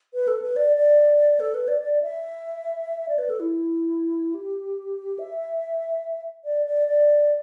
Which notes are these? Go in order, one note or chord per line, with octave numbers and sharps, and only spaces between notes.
B4
A4
B4
D5
D5
A4
B4
D5
D5
E5
D5
B4
A4
E4
G4
E5
D5
D5
D5